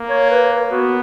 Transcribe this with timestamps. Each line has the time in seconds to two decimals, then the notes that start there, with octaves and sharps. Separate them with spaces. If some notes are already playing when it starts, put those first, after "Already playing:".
Already playing: A#3
0.09 C#5
0.30 B4
0.51 A#4
0.71 B3 F#4